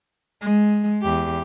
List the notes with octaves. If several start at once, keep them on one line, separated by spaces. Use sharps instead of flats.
G#3
E2 G4